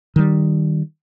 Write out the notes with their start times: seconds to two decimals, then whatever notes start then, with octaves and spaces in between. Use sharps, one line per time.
0.16 D#3 G3